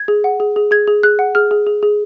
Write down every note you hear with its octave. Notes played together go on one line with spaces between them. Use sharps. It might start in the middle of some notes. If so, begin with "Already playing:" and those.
Already playing: G#6
G#4
F#5
G#4
G#4
G#4 G#6
G#4
G#4 F#6
F#5
G#4 F6
G#4
G#4
G#4